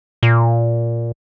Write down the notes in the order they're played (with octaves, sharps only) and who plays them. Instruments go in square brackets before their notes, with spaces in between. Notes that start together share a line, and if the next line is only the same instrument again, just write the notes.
[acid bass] A#2